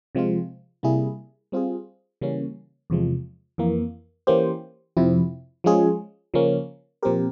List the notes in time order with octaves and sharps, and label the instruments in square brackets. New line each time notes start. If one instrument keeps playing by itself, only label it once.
[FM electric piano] C3 F3 G#3 C4 F4
C3 G3 A#3 E4 G#4
G3 C4 F4 G#4
C#3 E3 G3 A#3 C#4
E2 C3 F3 G#3
F2 E3 A#3
E3 A#3 C#4 G4 C5
F2 C3 F3 C4 E4
F3 G#3 C#4 F4 G#4
C#3 F3 A#3 C#4
A#2 F3 C4 G4 A#4